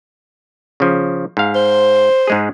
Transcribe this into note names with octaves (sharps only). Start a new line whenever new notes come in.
C#3 F3
G#2 F5
C5
G#2 G#3 G#4